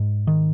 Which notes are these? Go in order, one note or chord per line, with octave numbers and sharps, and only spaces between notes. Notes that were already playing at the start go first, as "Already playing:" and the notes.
Already playing: G#2
D#3